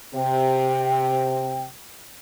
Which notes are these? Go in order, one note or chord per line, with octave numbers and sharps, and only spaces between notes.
C3 G5